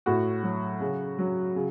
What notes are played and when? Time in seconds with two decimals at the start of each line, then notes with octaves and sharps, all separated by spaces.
0.06 A2 F#4
0.43 F#3
0.80 C#3
1.19 F#3
1.55 C#3